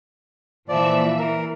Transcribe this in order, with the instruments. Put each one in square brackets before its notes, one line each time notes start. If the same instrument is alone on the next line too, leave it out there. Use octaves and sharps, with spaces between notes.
[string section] A#2 E3 E5 [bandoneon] F3 D5
[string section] E3 [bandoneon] A#4